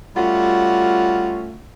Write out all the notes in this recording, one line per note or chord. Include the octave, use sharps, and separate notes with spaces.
G3 A3 C#4 F4 F#4